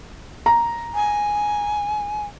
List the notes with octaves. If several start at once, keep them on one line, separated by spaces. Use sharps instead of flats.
A#5
G#5